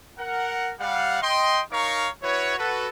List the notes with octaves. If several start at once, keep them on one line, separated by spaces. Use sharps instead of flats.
A#4 F#5
G3 F5 F#5
D#5 G5 C6
D#4 A#4 C#5 F5 A#5 C#6
E4 F#4 B4 C#5
F#4 A4 B4